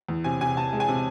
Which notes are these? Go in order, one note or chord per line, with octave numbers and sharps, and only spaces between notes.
E2
C3 G#5
C3 G#5
C3 A5
G#3
G#5
C3